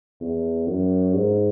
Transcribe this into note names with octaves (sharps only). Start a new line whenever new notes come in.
E2
F#2
G#2